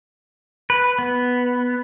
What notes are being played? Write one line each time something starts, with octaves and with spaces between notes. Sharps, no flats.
B4
B3